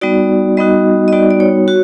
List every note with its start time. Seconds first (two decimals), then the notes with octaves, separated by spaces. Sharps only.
0.01 G3 B3 D#4 F#4 D5
0.57 G3 B3 D#4 F#4 D#5
1.08 D#5
1.12 G3 B3 D#4 F#4 D5
1.31 D5
1.40 C#5
1.68 F#4